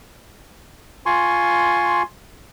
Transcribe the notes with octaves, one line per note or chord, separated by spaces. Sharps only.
F4 G#5 C6 C#6